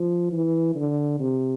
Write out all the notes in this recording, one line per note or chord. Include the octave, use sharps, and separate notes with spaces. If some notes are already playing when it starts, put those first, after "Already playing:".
Already playing: F3
E3
D3
C3